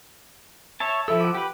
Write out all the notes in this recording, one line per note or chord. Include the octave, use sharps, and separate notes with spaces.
C#5 E5 A5
F3 E4 A4 E5 E6
F#5 D6
G4 B4